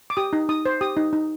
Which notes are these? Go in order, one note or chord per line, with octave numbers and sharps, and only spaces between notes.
D6
G4 D#6
D#4
D#4 D#6
C5
G4 D#6
D#4
D#4